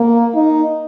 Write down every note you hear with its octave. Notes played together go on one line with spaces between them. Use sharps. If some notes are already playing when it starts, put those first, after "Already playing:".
Already playing: A#3
D#4